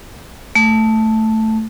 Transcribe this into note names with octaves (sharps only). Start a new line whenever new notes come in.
A3